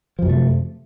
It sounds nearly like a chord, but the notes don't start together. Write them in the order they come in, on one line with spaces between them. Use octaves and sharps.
F3 F#2 C3 A3